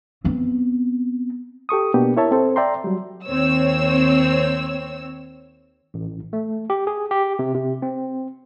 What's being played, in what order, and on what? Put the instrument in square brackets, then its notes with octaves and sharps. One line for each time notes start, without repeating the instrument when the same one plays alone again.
[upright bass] B3 C4
[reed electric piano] G4 A4 C#6 D#6
B2 A#3 B3 D4 G4
E4 A#4 C#5 E5 A5
C4 A4 C5
D5 E5 G5 A#5 C6
F#3 G3
[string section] D#2 C4 C#5 E6
[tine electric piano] A1
A3
G4
G#4
G4
C3
C3
C4